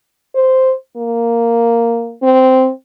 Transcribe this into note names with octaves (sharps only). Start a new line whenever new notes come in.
C5
A#3
C4